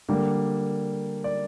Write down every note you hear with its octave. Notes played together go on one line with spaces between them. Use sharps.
D3 G3 A#3
D5